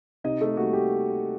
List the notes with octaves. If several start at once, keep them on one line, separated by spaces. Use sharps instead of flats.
C3 D#4 D#5
A3 A4
G3 A#3 F#4
G4